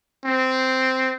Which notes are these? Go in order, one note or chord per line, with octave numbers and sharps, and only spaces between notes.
C4